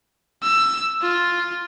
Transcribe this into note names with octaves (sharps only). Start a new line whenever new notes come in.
E6
F4